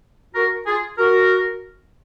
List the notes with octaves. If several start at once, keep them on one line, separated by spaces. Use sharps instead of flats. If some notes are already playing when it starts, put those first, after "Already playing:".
F#4 A#4
F4 G#4
F#4 A#4